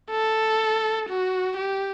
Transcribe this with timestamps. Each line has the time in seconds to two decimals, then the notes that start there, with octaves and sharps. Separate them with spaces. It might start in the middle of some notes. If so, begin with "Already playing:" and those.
0.11 A4
1.09 F#4
1.58 G4